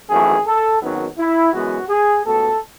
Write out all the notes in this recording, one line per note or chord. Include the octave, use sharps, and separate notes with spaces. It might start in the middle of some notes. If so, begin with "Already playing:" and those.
G#1 F#2 E3 A3 G#4
A4
G#1 F#2 D#3 F#3 B3
E4
F#2 E3 G#3 B3 F#4
G#4
C#2 B2 A3 A4